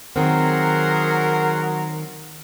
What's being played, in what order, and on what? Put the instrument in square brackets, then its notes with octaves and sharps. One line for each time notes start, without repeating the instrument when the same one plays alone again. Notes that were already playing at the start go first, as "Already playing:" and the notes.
[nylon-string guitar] D#3 C4 [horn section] F#3 A#4 [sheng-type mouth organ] G#4 F#5 C6